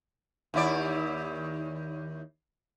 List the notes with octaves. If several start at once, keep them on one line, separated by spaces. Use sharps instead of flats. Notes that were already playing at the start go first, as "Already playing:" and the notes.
D#2 E4 D5